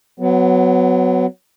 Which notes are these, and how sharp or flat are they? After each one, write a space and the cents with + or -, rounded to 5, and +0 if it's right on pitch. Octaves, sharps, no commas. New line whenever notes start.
F#3 +0 B3 +25